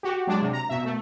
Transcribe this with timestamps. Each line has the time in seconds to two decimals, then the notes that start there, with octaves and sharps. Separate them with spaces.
0.03 F#4 G4
0.27 F#3 G#3 D4
0.42 C3
0.53 A#5
0.69 B2 E5
0.85 A3